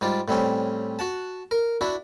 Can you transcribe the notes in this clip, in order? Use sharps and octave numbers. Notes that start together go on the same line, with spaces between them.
G#2 G3 F4 D5
A2 G3 C4 C#4
F#4 F#5 A5
A#4
D4 E4 F#4